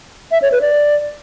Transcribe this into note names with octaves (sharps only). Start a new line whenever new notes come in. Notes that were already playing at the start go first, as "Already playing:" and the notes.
E5
C#5
B4
D5